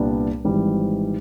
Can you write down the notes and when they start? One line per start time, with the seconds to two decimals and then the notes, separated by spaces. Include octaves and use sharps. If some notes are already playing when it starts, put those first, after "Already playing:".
Already playing: C2 A#2 G3 B3 D4
0.45 G#1 G#2 E3 G3